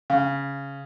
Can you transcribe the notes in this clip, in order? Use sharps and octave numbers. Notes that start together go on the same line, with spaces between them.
C#3